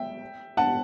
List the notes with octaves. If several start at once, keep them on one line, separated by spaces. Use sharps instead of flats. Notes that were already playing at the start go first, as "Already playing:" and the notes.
Already playing: E5 G5
F#5 A5